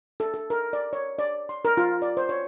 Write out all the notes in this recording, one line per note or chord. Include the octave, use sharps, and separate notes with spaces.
A4
A4
A#4
D5
C#5
D5
C6
A#4
F4
D5
C5
C#5